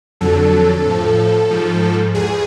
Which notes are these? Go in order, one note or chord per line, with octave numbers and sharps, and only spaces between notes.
F2 D3 F#3 A4
A2 F3
G#2 F3
E2 G#4